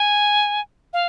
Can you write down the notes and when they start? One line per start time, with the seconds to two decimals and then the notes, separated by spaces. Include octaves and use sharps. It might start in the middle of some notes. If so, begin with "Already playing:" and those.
Already playing: G#5
0.93 F5